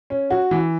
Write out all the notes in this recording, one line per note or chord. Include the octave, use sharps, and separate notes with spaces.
C#4
F#4
E3